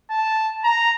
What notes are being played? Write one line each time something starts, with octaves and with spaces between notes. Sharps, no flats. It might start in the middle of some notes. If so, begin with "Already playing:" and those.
A5
A#5